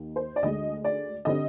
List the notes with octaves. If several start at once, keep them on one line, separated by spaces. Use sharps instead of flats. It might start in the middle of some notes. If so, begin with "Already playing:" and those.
Already playing: D#2 D#3 A#3
C5
D5
D2 D3 G#3 D#5
D5
D3 G3 C4 D#5